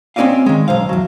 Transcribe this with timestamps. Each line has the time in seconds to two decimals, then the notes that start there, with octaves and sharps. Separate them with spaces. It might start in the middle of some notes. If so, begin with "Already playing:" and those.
0.16 C4 C#4 F4 D5 D#5 F5
0.46 D#3 G#3
0.68 B1 C5 F5
0.89 E2 F#3